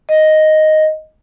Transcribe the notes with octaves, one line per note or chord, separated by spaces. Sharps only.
D#5